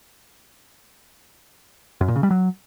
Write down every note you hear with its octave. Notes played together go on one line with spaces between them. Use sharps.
F#2
A#2
C#3
G3
F#3